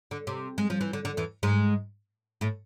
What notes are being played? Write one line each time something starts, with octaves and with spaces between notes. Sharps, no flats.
D3
C3
G#3
F3
E3
D3
D3
E2 E3
G#2 G#3
A2 A3